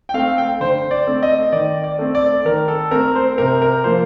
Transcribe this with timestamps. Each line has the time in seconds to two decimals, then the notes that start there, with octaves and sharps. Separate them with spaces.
0.09 G5
0.14 A3 C4 F5
0.38 G5
0.60 D3 C5
0.91 D5
1.07 A3 C4
1.23 D#5
1.52 D#3 D5
1.84 D5
1.99 A3 C4
2.15 D5
2.45 D#3 A#4
2.68 A4
2.91 A3 C4 A#4
3.16 C5
3.38 C3 A#4
3.62 A#4
3.84 F3 A#3 C5